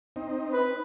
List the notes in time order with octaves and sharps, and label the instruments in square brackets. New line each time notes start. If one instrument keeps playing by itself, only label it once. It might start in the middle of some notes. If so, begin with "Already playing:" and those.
[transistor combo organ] C4 D#4
[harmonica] B4